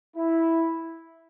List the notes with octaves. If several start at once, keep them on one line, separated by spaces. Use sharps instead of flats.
E4